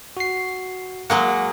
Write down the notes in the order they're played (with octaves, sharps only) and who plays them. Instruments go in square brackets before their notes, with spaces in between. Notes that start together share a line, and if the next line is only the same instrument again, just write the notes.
[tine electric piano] F#4 C7
[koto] F#3 G#3 A#3 [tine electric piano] F#5